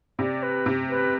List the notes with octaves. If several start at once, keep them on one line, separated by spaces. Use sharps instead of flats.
C3 D5
B4
C3
B4